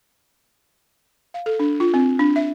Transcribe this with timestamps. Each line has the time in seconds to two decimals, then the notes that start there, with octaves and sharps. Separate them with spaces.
1.34 F5
1.46 A4
1.60 D4
1.80 F4
1.94 C4
2.19 D4
2.36 E5